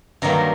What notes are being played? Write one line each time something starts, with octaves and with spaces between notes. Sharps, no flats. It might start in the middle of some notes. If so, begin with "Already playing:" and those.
G2 D#3 F#3 A#3 A#5